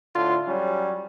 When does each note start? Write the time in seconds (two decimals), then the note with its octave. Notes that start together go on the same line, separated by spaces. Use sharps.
0.15 A2 D3 F4
0.47 F#3 G3 C#4